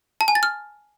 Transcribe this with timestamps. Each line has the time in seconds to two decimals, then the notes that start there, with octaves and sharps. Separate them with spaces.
0.21 A5
0.28 G#5
0.35 A6
0.43 F6